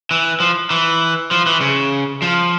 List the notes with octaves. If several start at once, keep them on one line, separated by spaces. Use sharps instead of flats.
E3
F3
E3
F3
E3
C#3
F3